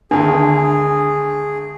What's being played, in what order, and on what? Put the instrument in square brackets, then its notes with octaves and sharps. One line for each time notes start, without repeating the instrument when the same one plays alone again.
[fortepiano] G#1 D2 [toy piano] D4 [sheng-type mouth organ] G#4